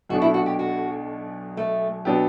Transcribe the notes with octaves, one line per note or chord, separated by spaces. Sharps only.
B1 B2 A3 D4 F#4
E4
F#4
G4
F#4
A3
B2 F#3 B3 D4 G4